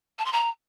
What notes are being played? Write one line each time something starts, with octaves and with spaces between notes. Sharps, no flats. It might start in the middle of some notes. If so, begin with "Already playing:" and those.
A5
C6
A#5